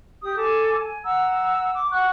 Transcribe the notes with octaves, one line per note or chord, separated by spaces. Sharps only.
G4 D#6
A4 G#5 D6
G#5
F#5 A#5 E6
D6
F#5 C#6 F#6